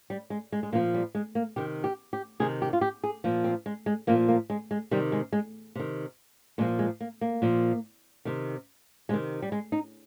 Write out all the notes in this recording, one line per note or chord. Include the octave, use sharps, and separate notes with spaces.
G3
G#3
G#3
G#3
A#2 F3 A#3
G3
G#3
A#3
C3 D#3 G4
G4
G4
C3 D#3 G#4
G4
F4
G4
G#4
A#2 F3
C4
G#3
G#3
A#2 F3 A#3
A#3
G#3
G#3
C3 D#3 G3
G#3
G#3
C3 D#3
A#2 F3 G#3
G#3
A#3
A#3
A#2 F3
C3 D#3
C3 D#3 G#3
G3
G#3
D#4